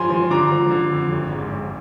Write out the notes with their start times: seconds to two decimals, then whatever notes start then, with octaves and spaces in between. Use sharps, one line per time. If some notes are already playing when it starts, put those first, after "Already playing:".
Already playing: G2 F3 G#5 C6
0.10 F3
0.30 D3 A#5 D6
0.52 F3
0.71 D3
0.92 F2
1.12 G#1
1.32 G#2
1.53 G#1